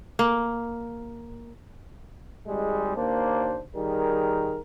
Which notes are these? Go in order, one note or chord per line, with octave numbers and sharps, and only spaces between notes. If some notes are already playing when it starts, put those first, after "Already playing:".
A#3
G#1 G3 G#3
D#2 A#3 D4 C5
D#3 G3 G#4 A#4